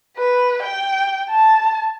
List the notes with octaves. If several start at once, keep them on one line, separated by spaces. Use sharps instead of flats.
B4
G5
A5